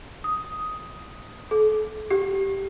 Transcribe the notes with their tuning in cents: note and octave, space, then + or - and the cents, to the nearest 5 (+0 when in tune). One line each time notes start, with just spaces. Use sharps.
D#6 +5
A4 -40
G4 -10